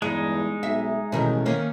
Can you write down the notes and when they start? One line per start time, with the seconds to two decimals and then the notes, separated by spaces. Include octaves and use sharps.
0.02 E2 G2 G#3 D#4
0.63 B1 E5
1.12 A1 B2 D#3
1.46 D#3 A#3 C#4